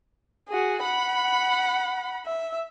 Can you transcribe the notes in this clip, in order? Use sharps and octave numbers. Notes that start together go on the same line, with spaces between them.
F#4 G#4
F#5 B5
E5